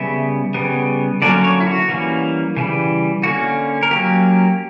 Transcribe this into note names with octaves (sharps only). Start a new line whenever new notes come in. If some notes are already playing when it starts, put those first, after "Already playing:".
Already playing: C#3 G3 B3 E5
C#3 G3 B3
D3 F#3 A#3 C#4 D5
C#5
E4
F#4
E3 G3 A#3 C#4
C#3 E3 G3
D3 A#3 C#4 F#4
A#4
F#3 A#3 C#4 G4